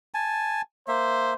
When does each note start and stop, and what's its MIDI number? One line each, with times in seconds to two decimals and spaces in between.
0.14 0.62 80
0.14 0.62 81
0.88 1.34 58
0.88 1.36 72
0.88 1.34 76